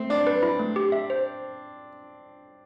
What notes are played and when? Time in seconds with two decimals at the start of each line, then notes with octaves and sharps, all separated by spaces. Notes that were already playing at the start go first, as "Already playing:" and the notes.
Already playing: A3 C4
0.10 D4 D5
0.27 B4
0.43 E4
0.59 A3
0.76 G4
0.92 E5
1.10 C5